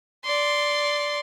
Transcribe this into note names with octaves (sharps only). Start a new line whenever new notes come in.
D5 C6